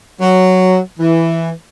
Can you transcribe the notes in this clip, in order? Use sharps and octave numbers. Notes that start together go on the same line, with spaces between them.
F#3
E3